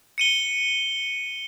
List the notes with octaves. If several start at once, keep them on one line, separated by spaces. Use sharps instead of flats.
C#7 D#7 G7